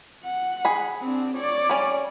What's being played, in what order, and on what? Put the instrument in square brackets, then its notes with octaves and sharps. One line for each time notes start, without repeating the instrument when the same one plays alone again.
[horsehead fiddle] F#5
[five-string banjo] G#4 B5
[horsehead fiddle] C4 D4
C#5 D5
[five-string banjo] G3 C#4